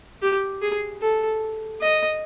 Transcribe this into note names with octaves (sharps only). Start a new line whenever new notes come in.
G4
G#4
A4
D#5